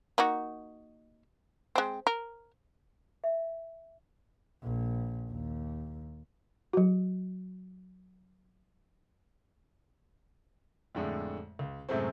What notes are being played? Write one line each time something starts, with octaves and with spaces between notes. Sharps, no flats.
A#3 D#4 F#4
G#3 C4
A#4
E5
A#1
D#2
F#3 F#4
F2 A2 D3 G#3 A3
C#2
F#2 A2 C3 G#3 A3 C4